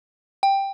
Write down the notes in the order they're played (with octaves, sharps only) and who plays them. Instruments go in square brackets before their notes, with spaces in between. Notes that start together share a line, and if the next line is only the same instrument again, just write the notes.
[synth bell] G5